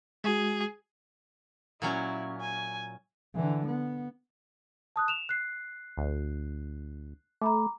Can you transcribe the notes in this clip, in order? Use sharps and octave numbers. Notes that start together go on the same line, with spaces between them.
G#3 F#4 G#4
A#2 F#3 C#4 E4
G#5
D3 E3
B3
A5 D#6 F#6
E7 F7
F#6 C7
D2
A3 A#5 B5 D6